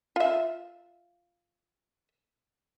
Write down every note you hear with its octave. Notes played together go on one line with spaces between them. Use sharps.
F4 E5